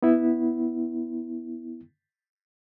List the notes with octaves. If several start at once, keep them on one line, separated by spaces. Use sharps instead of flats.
B3 E4